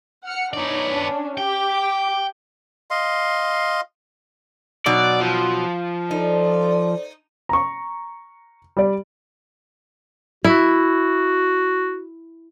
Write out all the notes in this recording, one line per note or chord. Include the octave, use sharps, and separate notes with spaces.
F#5 F6 C#7
B3 D4 D#4 C#5 D5
C#4 D4
G4 G5 D6
D#5 F5 C6
B2 F#3 D#4 D5
F3
D#4 A4 C5 D5
A#5 C#6
G3 D5
E4 F#4